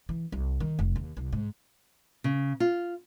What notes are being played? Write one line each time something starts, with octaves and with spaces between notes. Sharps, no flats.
E3
C2
D#3
F1
D#2
C2
G#2
C#3
F4